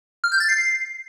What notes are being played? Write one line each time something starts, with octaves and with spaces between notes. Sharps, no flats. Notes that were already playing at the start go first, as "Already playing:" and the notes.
F6
G6
A6
C7